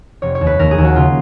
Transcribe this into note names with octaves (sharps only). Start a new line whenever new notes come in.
F1 C#5
C#5
D#2
B4
D#2 A#4
G#4
D#2
F#4
C#3 F4